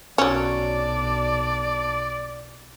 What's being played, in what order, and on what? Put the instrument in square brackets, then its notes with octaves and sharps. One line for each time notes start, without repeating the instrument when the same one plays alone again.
[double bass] B1 D4 [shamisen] F#3 C#4 [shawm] D5